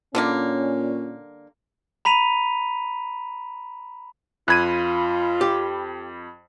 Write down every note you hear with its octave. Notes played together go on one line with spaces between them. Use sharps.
A#2 D3 G3 A#3 C#4
A#5 B5 B6 D#7 F7
F2 F4 B5 F#6 G#6 D#7
G4